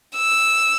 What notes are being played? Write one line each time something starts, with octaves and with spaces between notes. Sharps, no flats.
E6